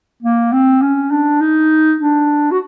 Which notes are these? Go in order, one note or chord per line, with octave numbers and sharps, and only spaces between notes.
A#3
C4
C#4
D4
D#4
D4
F#4